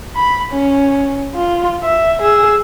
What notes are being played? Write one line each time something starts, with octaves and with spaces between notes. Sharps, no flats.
B5
C#4
F4
E5
G#4 E6